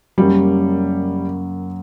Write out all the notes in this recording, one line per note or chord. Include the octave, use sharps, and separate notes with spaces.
F#2 C#3 F#3 G3 A#3 C#4